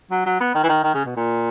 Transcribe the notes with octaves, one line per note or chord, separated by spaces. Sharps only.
F#3
F#3
B3
D#3
E3
D#3
D#3
C#3
B2
A#2